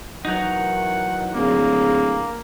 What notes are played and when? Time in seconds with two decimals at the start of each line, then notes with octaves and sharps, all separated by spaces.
0.25 D#3 E3 F#3 D#4 F#5
1.34 D1 A#3 G#4